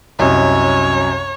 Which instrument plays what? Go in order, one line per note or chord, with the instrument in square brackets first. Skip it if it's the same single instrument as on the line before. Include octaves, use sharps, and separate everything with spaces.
[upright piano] C2 F#2 D#5 [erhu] C#5